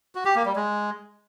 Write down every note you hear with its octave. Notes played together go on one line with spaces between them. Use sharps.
F#4
G4
A#3
G3
G#3